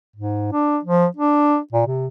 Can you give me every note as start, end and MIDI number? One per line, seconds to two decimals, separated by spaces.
0.16 0.48 44
0.53 0.79 62
0.85 1.06 53
1.17 1.58 62
1.73 1.85 46
1.86 2.08 48